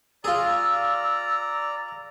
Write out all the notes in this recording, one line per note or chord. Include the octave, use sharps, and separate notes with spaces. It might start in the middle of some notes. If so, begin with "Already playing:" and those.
F4 G#4 D5 A#5 E6